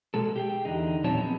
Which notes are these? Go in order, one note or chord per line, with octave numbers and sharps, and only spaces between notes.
B2 G#3 A4
G4 G#4 G5
E2 D3 D#4
A#2 F3 F#3 C4 C#5 A5
B3 C4 G#4